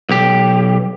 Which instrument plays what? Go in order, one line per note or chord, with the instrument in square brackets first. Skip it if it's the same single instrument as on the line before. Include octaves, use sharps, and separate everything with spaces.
[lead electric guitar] B1 G4